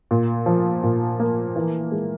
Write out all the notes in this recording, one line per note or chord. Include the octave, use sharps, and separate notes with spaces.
A#2
F3
A#2
A#3
E3
G#3